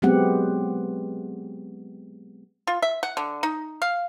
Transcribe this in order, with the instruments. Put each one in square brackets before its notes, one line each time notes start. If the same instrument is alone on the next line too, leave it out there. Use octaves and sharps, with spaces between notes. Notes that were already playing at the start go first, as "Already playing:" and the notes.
[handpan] F#3 G#3 B3 C4 G4 F#5
[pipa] F4
E5
F#5
D3
D#4
F5